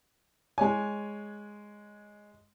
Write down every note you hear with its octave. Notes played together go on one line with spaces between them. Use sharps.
G#3 C#5 G#5